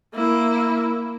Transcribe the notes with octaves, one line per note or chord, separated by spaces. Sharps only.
A#3 E4